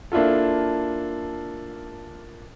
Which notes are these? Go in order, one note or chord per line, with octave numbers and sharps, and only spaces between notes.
A#3 D4 E4 F4 A4